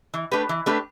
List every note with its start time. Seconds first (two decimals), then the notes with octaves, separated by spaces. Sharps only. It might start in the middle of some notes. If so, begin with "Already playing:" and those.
0.14 E3
0.31 A3 D4 G4 B4
0.49 E3
0.66 A3 D4 G4 B4